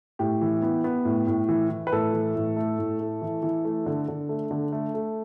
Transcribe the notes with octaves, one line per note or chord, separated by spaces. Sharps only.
A2 G4
E3
B3
B3
A2
A2
E3
E3
B4
A2 A4
E3
A2
A3
A2
A3
E3
E3
A3
D3
D3
A3
D3
A3
A3